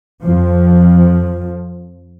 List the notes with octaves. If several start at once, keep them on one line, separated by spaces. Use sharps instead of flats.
F2 F3